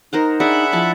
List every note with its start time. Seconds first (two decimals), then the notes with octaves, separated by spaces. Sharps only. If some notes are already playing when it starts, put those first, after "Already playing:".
0.13 D#4 A#4 C5 F#5
0.40 D4 G#4 D5 E5 F#5 B5
0.73 F3 E4 A5